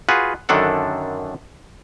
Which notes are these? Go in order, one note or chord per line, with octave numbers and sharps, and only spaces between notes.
F4 F#4 G#4 B4 F#5
F#2 D3 D#3 D4 A4 F#5